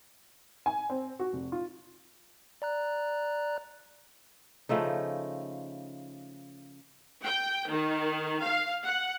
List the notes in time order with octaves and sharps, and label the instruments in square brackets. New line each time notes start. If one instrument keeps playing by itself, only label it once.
[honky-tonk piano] G#5
C4
F#4
F1
F4
[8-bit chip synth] D5 A#5 F#6
[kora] C#3 F3 A3 D#4
[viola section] G5
D#3
F5
F#5